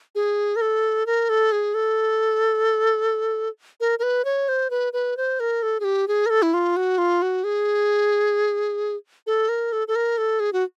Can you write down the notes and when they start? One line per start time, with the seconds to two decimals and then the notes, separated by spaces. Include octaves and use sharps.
0.15 G#4
0.56 A#4
0.61 A4
1.06 A#4
1.29 A4
1.52 G#4
1.74 A4
3.80 A#4
3.99 A#4
4.03 B4
4.25 C#5
4.49 C5
4.70 B4
4.93 B4
5.17 C5
5.40 A#4
5.63 A4
5.80 G#4
5.84 G4
6.08 G#4
6.26 A#4
6.30 A4
6.42 E4
6.54 F4
6.76 F#4
6.98 F4
7.22 F#4
7.44 G#4
9.27 A4
9.49 A#4
9.72 A4
9.88 A4
9.96 A#4
10.18 A4
10.40 G#4
10.53 F#4